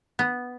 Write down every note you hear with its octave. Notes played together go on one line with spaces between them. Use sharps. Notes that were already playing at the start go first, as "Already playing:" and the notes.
B3